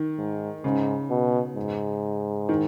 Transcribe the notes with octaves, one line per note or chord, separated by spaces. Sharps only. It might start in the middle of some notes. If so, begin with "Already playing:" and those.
Already playing: D#3
G#2
G#2 C#3
B2
G#2
D#3